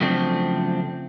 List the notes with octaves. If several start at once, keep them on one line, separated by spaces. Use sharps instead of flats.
F#2 C#3 F3 A3 C4 D4